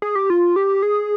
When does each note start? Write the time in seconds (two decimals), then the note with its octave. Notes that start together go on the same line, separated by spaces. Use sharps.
0.02 G#4
0.15 G4
0.30 F4
0.56 G4
0.83 G#4